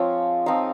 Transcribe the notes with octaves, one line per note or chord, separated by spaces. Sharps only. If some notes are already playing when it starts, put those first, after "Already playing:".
Already playing: F3 G#3 C4 F4 C#5
F3 C4 D#4 F5